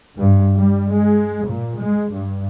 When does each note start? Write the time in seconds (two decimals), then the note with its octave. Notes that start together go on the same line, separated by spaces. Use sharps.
0.16 G2
0.55 G3
0.92 G#3
1.46 A#2
1.79 G#3
2.10 G2